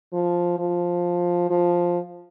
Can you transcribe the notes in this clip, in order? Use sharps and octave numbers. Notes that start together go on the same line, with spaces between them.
F3
F3
F3